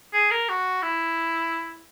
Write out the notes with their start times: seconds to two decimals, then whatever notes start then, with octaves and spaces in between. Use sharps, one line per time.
0.14 G#4
0.31 A#4
0.49 F#4
0.83 E4